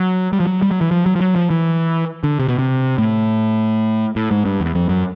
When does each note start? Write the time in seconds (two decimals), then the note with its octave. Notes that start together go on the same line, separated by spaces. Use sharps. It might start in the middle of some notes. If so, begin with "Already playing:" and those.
Already playing: F#3
0.33 G3
0.40 F3
0.47 F#3
0.62 G3
0.71 F#3
0.81 E3
0.91 F3
1.06 F#3
1.15 F3
1.21 F#3
1.36 F3
1.50 E3
2.24 D3
2.40 C3
2.48 B2
2.59 C3
2.98 A2
4.16 A2
4.31 G#2
4.46 G2
4.60 E2
4.75 F2
4.89 F#2